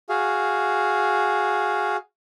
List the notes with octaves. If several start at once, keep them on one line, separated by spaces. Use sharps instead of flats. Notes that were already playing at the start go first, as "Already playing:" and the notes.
F#4 G#4 F5